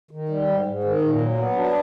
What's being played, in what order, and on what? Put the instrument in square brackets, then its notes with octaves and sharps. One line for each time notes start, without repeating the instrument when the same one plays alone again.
[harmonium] D#3
G3
G#2
G#2
D#3
A#2
F#3
B3
D4